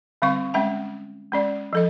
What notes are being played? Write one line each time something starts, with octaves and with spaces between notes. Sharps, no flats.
D3 G3 C4 F5 C#6
G#3 C#4 E5 G5
G#3 C#4 D5
F3 A4 D#5